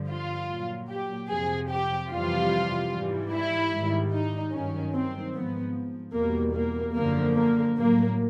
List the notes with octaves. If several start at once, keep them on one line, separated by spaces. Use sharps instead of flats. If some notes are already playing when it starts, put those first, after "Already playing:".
Already playing: G2 D3 F3
F4
A#2 F#3
G4
F2 C3 F3 G#4
G4
F2 C3 E3 G3 F4
G#2 E3 G3
E4
G#2 D#3 G3
D#4
G2 D#3 F#3 C#4
C4
G#2 F3 B3
E2 B2 G3 A#3
A#3
F#2 D3 F3 A#3
A#3
A2 F#3 A#3